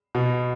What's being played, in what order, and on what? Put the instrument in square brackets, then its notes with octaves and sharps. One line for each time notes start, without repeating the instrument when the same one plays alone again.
[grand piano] B2